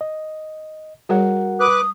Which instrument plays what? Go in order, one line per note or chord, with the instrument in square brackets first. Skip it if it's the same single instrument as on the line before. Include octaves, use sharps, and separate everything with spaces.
[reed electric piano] D#5
[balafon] G3 G#4 C#5 [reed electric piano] F#4 A#4 F#5
[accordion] B4 D6 F#6 [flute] D#6